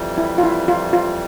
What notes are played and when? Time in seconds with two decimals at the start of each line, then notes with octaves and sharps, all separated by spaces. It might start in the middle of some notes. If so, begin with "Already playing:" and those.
Already playing: F2 E3 G3
0.18 E4
0.38 F4
0.43 E4
0.68 F4
0.93 F4